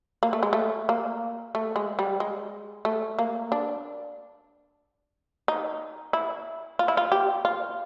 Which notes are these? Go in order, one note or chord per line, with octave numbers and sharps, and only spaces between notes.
A#3
A3
G#3
A3
A#3
A3
G#3
G3
G#3
A3
A#3
D4
D#4
E4
F4
E4
F4
G4
F4